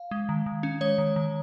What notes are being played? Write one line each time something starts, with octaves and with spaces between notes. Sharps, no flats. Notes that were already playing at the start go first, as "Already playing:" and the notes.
Already playing: F5
G#3
D#3
D#3
C#4
G#3 C#5
D#3
D#3